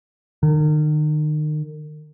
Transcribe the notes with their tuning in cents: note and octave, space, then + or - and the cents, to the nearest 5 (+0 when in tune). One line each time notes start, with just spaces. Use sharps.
D#3 -35